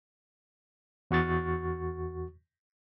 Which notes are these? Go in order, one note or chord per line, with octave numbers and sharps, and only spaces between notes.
E2 F#4 C#6 A6